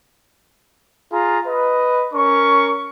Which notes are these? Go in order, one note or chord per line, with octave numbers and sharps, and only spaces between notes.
F4 G#4 A#5
B4 D#5
C#4 A#4 C#6